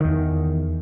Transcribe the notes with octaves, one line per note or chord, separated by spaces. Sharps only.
E2 D#3